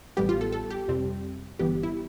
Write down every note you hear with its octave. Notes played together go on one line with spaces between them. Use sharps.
A1 A2 G3 B3 G4
F4
A4
A4
G4
F2 C3 G3 C4
G1 G2 E3 G3 B3 G4
E4